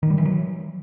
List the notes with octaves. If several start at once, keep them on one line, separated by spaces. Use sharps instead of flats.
D#3
G3
E3
F#3